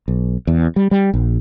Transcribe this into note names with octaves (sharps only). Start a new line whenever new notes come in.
B1
E2
G3
G3
A#1